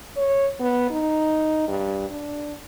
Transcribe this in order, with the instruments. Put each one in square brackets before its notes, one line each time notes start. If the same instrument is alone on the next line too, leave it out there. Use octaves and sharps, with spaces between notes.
[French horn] C#5
B3
D#4
G2
D4